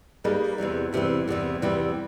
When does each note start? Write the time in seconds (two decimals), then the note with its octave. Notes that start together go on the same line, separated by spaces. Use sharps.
0.24 G3 A#3 D#4 G#4 B4
0.58 E2 C3 E3 G3
0.93 E2 C3 E3 G3
1.28 E2 C3 E3 G3
1.62 E2 C3 E3 G3